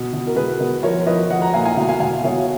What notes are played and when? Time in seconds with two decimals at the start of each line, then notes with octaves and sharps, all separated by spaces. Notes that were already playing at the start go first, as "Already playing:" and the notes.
Already playing: B2
0.13 B2
0.27 A#4
0.36 B2 G#4 B4
0.60 B2
0.83 F3 A#4 C#5
1.06 F3 B4 D#5
1.30 F3 D#5 F#5
1.41 F#5 A#5
1.53 A#2 F5 G#5
1.65 F5 G#5
1.77 B2 F5 G#5
1.89 F5 G#5
2.00 B2 F5 G#5
2.24 B2 C#5 F5